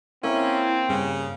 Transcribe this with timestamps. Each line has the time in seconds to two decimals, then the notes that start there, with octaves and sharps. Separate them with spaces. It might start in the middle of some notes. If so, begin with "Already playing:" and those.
0.23 A#3 C4 C#4 E4
0.89 G2 C#3